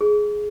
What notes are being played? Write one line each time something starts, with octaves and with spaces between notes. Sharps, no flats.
G#4